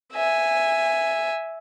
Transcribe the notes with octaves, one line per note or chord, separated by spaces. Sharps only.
E5 G#5